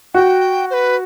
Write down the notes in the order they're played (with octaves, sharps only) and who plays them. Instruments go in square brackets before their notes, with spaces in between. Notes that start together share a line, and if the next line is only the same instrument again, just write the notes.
[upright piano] F#4 [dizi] G5
[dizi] C5
B4